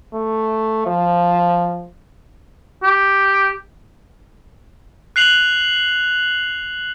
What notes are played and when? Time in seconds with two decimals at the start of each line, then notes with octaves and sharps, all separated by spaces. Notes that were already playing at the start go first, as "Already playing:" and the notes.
0.14 A3
0.86 F3
2.83 G4
5.16 F#6 C7 F7 F#7